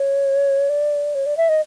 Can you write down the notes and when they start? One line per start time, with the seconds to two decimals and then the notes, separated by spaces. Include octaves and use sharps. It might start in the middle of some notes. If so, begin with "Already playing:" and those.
Already playing: C#5
0.69 D5
1.15 C#5
1.26 D5
1.37 E5
1.49 D#5